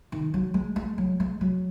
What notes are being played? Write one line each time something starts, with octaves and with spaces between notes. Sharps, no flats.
D#3
F#3
G#3
G#3
F#3
G#3
F#3